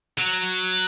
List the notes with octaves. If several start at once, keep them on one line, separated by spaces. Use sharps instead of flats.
F#3